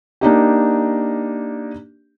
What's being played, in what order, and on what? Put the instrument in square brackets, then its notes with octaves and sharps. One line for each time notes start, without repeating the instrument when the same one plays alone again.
[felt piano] A#3 D4 D#4 G4